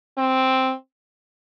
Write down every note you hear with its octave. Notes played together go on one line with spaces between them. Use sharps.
C4